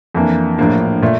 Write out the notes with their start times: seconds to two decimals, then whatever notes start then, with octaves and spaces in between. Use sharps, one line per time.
0.15 F2 E3 A#3 D4
0.58 A#1 A2 F3 A#3 D4
1.02 A#2 A3